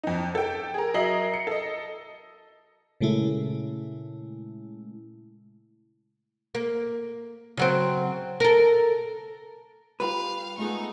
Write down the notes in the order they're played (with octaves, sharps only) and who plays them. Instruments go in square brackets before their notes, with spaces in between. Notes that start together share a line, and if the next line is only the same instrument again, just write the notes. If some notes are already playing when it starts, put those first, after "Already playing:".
[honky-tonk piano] F2 D#4
A4 G5
G#4 A#4
F#3 A#4 D#5 E5 C7 F#7
C#7
A4 D#5
[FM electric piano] A#2 C#3 G#3 A3 E4
[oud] A#3
C#3 F#3 C4
A4 A#4
[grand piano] G3 F4 G4 [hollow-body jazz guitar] B4 [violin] F5
[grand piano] G#3 F4 G#4 [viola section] A3 B3 [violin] D#4 C#6